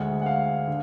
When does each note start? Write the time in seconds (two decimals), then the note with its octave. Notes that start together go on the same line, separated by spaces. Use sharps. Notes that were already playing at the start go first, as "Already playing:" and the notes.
Already playing: D2 D3 G#3 F#5
0.22 F#5
0.26 F5
0.67 D3